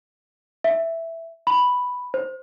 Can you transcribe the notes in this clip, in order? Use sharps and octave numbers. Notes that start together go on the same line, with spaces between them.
E5
B5
C5